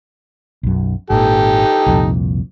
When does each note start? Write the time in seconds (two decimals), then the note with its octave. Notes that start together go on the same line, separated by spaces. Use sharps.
0.63 B1 F#2
1.10 G#1 A#2 D#4 G4 A4
1.86 C2 F2 A#2